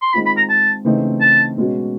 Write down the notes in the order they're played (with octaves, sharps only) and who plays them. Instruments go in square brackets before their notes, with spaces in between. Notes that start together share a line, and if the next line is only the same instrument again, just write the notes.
[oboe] C6
[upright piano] D#3 G#3 C4 F4 [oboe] B5
[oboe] B5
A#5
A5
[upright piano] C#3 E3 A3 C4 D#4
[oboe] A5
[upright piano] B2 G#3 C#4 F#4